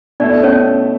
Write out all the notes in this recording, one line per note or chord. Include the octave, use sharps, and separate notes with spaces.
B2 A3 D4 E4 A4 D5
C#4 C#5